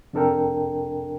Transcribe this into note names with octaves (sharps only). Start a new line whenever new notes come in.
F2 C3 D4 A4 A#4 G5